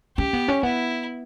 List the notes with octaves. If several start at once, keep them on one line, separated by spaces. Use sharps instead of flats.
C#4 G4
B3
C#4
B3 E4